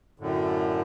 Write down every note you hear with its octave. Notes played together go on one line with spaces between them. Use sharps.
F#2 A2 D3